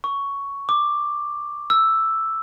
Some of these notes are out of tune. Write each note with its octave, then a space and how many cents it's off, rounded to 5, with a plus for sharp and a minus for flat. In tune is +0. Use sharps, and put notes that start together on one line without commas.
C#6 +10
D6 +10
E6 +5